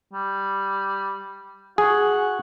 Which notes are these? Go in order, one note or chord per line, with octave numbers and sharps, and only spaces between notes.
G3
F#4 G#4